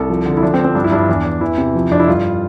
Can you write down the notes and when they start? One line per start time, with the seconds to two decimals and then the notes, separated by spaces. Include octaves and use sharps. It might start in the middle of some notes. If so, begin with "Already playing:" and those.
Already playing: C2 A4
0.09 F3
0.26 D3
0.37 E4
0.42 F3 D4
0.54 C4
0.59 F3
0.64 C4
0.75 G2 D4
0.84 E4
0.92 G2 D4
1.09 E2
1.25 E2
1.41 E3 E4
1.58 C3
1.75 F3
1.91 F2 D4
2.00 E4
2.08 G2 F4